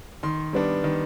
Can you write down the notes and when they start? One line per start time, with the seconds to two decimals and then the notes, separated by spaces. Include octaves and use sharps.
0.23 D#3 C6
0.53 G3 B3 D4
0.84 D#3